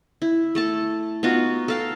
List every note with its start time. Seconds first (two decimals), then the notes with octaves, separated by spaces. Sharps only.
0.22 E4
0.55 A3 A4 A5
1.23 B3 D#4 F4 F#4
1.68 A4 F5 G5